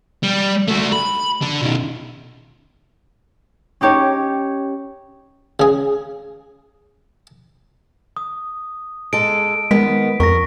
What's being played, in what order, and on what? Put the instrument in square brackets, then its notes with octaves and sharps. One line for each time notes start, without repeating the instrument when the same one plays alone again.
[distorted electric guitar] G3
A3 F#4
B5
D3
B2 D#3
[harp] C#4 D#4 G4 C#5
[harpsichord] C#3 G#4
[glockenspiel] D#6
[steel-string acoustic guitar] G#3 A4 [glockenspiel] D7
[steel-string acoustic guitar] D#3 B3 [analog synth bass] G#3 [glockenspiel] B6
[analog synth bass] F2 [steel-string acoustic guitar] A#4 [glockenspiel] C#6 A#6